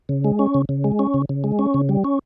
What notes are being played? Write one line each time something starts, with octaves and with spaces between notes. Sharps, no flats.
C#3
G#3
C#4
C#3
C#3
G#3
C#4
C#3
C#3
G#3
C#4
C#3
G3
C#4